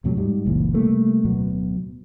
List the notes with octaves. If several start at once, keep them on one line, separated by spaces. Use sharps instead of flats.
D#2 A2 C3 F#3
G#2 G3
F#1 C#2 A#2 E3
C3 G3 A3 A#3
D1 B2 F#3 B3